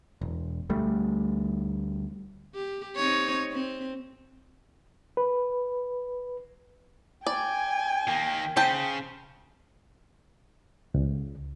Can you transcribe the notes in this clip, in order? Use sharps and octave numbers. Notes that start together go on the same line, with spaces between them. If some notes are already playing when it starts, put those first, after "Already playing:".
E1
D2 G3 A3
G4
C4 D#4 C#5
C4
B4
D5 G5 G#5
D#3 A#3
C#3 C5 G5 A5
C#2